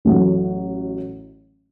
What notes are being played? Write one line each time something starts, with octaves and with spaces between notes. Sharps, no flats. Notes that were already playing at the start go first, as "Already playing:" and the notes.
A1 A2 F#3